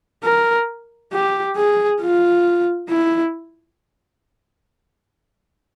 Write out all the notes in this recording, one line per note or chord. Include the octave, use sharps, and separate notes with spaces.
A#4
G4
G#4
F4
E4